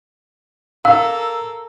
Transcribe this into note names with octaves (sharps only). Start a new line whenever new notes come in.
A#3 A4 F5 E6